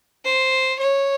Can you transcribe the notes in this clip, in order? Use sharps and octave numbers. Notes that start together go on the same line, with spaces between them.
C5
C#5